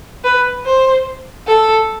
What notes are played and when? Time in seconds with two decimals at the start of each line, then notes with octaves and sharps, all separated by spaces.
0.24 B4
0.65 C5
1.47 A4